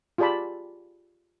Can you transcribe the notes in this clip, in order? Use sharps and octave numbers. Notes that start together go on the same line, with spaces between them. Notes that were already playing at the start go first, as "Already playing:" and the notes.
F4 G4 G#4 D5 A5 B5